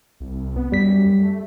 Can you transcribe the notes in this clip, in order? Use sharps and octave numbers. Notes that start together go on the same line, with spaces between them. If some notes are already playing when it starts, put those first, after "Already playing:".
C2
B3
F#2 G3 B6
A3